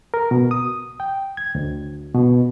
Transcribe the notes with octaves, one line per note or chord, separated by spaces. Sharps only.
A#4
B2
D#6
G5
G#6
D2
B2